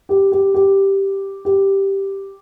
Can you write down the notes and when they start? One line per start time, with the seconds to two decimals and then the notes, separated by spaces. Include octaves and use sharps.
0.09 G4
0.32 G4
0.54 G4
1.45 G4